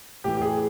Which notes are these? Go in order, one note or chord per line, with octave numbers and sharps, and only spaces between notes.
A2 E3 G4
G4
G#4